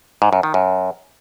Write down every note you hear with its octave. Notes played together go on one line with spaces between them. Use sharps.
G#2
F#2
D#3
F#2